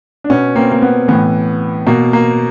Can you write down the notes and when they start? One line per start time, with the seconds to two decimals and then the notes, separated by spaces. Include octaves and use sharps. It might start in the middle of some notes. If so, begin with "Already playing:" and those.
0.24 D4
0.30 B2 B3 C#4
0.55 A#3 C4
0.71 A#3
0.82 B3
1.08 A2 E3 B3
1.87 B2 A#3
2.13 A#3